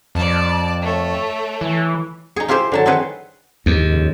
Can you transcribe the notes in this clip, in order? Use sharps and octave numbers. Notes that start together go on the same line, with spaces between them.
F2 D5 A5
A3 C#5
E3
D#4 G#4
E4 F4 G4 G#4 C5
D3 F#3 A5
C4 D#4 G#4 B4 F#5
D#2 G#2
F2 C#3